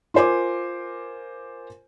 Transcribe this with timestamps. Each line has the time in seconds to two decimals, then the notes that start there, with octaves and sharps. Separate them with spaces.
0.14 F4 A#4 C5 G#5 D6